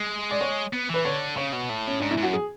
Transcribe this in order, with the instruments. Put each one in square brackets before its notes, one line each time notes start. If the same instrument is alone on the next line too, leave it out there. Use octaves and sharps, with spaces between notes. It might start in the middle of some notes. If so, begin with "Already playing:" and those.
Already playing: [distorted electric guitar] G#3
[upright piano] D5
C#5
[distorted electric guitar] B3
[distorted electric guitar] E3 [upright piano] B4
[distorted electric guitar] D3 [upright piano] C#5
[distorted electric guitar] C#3 [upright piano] C#5
[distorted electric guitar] B2
A2
[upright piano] C#4
[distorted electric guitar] G#2 [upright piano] D4
[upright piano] E4
[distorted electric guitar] G#2
[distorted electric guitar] F#2 [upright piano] F#4
[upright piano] G#4